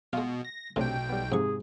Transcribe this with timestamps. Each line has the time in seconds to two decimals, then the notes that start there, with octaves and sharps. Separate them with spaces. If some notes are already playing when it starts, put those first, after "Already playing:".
0.13 B2 G#3 F4
0.45 A#6
0.76 B1 A2 C3 C4 D4 G5
1.09 G3 B3
1.32 F2 G#2 C3 G#4 C#6